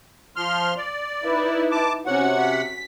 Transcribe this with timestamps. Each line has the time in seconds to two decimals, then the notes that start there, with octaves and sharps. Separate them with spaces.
0.37 F3 C6 F6
0.77 D5
1.23 D#4 E4 B4
1.71 A5 D6
2.06 C3 C#4 F#4 C#5 F#5
2.41 B6